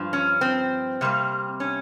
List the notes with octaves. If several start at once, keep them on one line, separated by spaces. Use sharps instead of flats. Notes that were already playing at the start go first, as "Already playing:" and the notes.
Already playing: G2 F3
C#4
C4
C3 G3 A#3
C#4